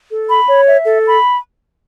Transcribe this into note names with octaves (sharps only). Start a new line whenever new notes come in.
A4
B5
C#5
E5
A4
B5